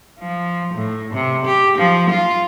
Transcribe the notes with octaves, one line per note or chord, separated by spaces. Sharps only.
F3
A2
C3
G4
F3
F4